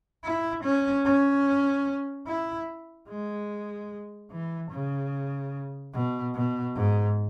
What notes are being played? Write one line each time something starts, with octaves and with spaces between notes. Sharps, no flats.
E4
C#4
C#4
E4
G#3
E3
C#3
B2
B2
G#2